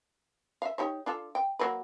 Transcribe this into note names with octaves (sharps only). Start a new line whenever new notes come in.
E5 F5
D#4 G4 C#5
D4 F4 A4
G5
F#3 A#3 B4